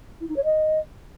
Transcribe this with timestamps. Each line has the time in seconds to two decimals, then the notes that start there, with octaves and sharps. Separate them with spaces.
0.20 E4
0.28 D#4
0.36 C#5
0.44 D#5